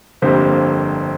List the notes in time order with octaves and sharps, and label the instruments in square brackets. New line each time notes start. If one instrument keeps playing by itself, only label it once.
[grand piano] G1 F2 D3 G3 A#3 C4 C5